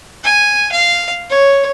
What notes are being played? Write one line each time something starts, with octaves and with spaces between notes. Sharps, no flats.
G#5
F5
C#5